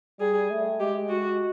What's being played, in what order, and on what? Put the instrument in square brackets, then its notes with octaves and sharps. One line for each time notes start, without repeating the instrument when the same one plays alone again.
[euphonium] G3 [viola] G#4
[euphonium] A3
[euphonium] G#3 [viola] G4
[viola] F#4